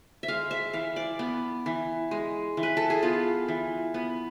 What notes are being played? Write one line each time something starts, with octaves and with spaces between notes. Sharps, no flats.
E5
G#3 F5
E5
E3 F5
D5
B3
E3
G#3
E3
B4
A4
G#4
B3 F4
E3
B3